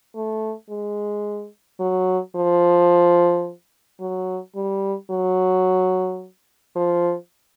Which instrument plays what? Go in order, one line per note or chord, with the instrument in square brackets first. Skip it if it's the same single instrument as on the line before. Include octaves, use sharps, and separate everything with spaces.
[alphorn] A3
G#3
F#3
F3
F#3
G3
F#3
F3